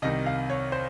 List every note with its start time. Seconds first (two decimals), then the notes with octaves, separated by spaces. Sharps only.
0.02 C2 C3 D#3 D#5
0.26 F5
0.50 C#5
0.72 C5